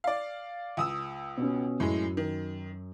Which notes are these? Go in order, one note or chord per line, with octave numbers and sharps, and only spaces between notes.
D5 F5
C#2 D#6 E6
B2 C#4
F#2 A2 G#3
D#3